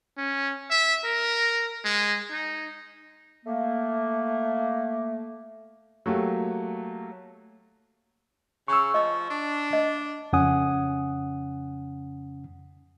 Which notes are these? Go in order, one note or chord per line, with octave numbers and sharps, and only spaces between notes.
C#4
E5
A#4
G#3
D#4
A3 A#3
F#3 A3 A#3 G4
C#3 C#6 E6
F3 D#5
D4
D#5
F2 C#3 C#4 F#5 G#5 D#6